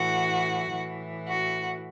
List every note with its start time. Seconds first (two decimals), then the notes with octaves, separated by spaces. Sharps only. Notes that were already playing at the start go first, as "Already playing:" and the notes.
Already playing: A2 E3 F#4
0.72 A2 E3
1.27 F#4